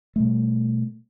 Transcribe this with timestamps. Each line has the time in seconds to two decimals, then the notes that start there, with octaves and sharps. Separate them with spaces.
0.16 B2 G3 A3